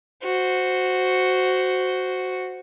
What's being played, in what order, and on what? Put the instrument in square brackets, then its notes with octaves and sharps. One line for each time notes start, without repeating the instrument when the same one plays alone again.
[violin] F#4 C5